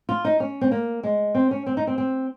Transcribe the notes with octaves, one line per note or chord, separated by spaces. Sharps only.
F4
D#4
C#4
C4
A#3
G#3
C4
C#4
C4
D#4
C4
C4